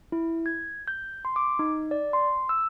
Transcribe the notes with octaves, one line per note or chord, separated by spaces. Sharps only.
E4
G#6
G6
C6
D6
D#4
D5
C6
E6